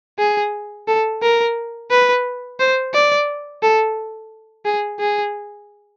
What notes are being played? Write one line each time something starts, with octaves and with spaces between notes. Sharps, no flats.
G#4
A4
A#4
B4
C5
D5
A4
G#4
G#4